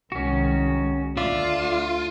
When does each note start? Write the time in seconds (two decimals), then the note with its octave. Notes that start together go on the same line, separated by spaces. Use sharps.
0.12 C2 D#3 G#3 C#4 F#4
1.17 D2 A3 D4 F4 D5 E5